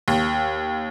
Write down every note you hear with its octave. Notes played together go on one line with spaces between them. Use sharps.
D#2